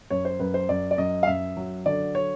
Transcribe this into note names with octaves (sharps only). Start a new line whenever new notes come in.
F#2 C#5
C5
F#2 B4
C5
F#2 D5
D5
F#2 D#5
F5
F#2 E5
F#3
D3 D5
C#5